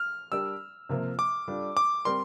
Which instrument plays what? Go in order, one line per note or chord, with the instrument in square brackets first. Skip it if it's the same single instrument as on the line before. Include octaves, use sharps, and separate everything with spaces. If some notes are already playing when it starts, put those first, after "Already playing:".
Already playing: [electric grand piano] F6
[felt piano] G3 D4 G4 A#4 D5 [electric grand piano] E6
[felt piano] C3 F3 A#3 F4 C5
[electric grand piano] D6
[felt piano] G3 D4 F4 A4
[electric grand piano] D6
[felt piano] G3 C4 G4 A#4 D5 [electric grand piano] C6